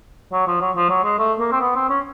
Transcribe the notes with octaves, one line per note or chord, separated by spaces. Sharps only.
F#3
F3
F#3
F3
F#3
G#3
A3
A#3
C4
B3
C4
C#4